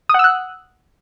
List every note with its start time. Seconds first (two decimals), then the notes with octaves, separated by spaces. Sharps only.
0.09 D#6
0.14 F#5
0.19 E6
0.24 F#6